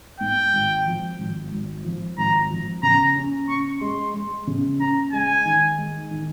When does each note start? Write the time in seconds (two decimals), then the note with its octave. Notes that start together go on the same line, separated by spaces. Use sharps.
0.20 G#2 G5
0.53 G#1
0.86 F3
1.19 G#1
1.52 G#1
1.84 F3
2.18 G#1 A#5
2.50 F3
2.83 C#3 A#5
3.16 C#4
3.48 C#4 C#6
3.81 G#3 C6
4.14 G#3
4.47 C#3
4.79 C#4 A#5
5.12 G#3 G#5
5.45 D#3
5.78 G#3
6.11 D#3